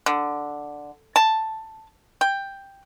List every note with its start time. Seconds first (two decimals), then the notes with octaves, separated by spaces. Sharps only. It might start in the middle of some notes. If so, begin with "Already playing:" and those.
0.06 D3
1.16 A5
2.21 G5